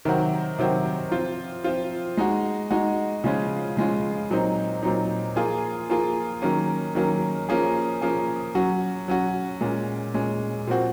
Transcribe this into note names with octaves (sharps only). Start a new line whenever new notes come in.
C3 D#3 F#3 C4 F#4
C3 D#3 F#3 C4 F#4
F3 C4 F4
F3 C4 F4
G#3 D#4 F#4
G#3 D#4 F#4
C#3 F3 G#3 C#4 F4
C#3 F3 G#3 C#4 F4
A#2 F#3 C4 D#4
A#2 F#3 C4 D#4
F3 A#3 F4 G#4
F3 A#3 F4 G#4
D#3 F#3 A#3 C#4
D#3 F#3 A#3 C#4
F3 A#3 C#4 G#4
F3 A#3 C#4 G#4
F#3 C#4 F#4
F#3 C#4 F#4
A#2 G#3 C#4
A#2 G#3 C#4
A#2 F3 C4 F#4